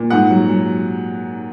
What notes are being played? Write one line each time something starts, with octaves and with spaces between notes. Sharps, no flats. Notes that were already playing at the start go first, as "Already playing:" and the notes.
Already playing: A#2
G#2 F#5
F#3
F#3